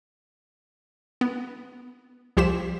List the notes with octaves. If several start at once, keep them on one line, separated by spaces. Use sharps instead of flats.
B3
C2 F3 G4 C5 B6 E7